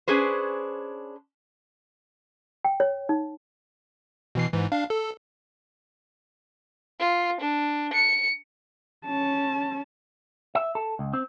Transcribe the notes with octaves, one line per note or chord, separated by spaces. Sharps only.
C#4 D4 G#4 B4 C5
G5
C#5
D#4
B2 E3 C7
G#2 E3
D4 F5
A4
F4
D4
C#7
C#4 A5
E5
A4
C#2
C4